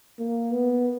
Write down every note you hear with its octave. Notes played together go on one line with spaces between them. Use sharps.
A#3
B3